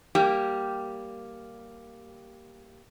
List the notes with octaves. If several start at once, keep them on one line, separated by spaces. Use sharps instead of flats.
G3 A#3 G4